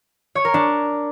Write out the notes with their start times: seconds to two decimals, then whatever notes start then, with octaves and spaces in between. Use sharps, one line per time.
0.35 C#5
0.45 A#4
0.54 D4